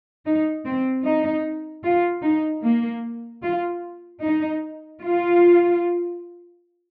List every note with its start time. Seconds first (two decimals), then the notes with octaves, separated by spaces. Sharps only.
0.26 D#4
0.65 C4
1.04 D#4
1.84 F4
2.23 D#4
2.64 A#3
3.43 F4
4.22 D#4
5.02 F4